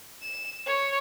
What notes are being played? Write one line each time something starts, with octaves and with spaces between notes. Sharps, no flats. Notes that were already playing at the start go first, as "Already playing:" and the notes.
E7
C#5